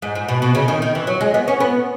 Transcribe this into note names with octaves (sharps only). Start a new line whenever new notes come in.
G#2
G#2
B2
B2
C#3
D#3
D#3
E3
F#3
G#3
B3
C#4
B3